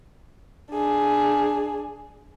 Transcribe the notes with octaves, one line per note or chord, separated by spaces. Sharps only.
D4 G#4